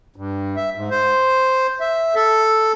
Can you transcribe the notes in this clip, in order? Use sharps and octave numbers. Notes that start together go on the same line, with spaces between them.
G2
E5
G#2
C5
E5
A4